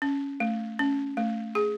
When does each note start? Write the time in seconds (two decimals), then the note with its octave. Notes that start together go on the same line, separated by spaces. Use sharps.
0.02 C#4
0.40 A3
0.79 C#4
1.17 A3
1.55 G#4